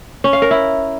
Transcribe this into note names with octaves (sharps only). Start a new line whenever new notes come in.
C#4
F5
A#4
E4